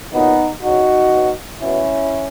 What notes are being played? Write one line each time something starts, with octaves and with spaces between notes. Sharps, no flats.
A#2 F#3 B3 D#4
C#3 F#3 D#4 F#4
B2 F#3
B2 F#3 C#4 E4